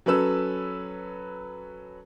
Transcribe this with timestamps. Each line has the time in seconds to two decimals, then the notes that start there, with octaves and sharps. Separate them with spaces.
0.06 F#3 C#4 A4 B4 E6